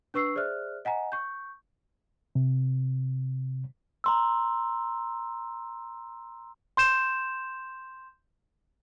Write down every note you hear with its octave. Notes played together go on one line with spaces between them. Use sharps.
D4 B4 C#6 E6 C7
G#4 C5 D5 E5 F6 F#6
D#5 F#5 G#5 A#5
C#6 G6
C3
A#5 C6 E6
C6 G6 E7